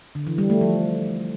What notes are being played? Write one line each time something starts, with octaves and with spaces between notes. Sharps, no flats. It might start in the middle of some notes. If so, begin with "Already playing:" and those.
D3
E3
G3
A3
F3